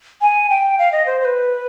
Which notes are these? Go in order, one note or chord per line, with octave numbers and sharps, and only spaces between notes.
G#5
G5
F5
D#5
C5
C5
B4